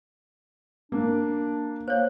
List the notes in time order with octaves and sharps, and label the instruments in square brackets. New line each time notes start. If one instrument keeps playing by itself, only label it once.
[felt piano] A#3 [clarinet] D4
[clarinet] A#3 [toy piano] C5 C#5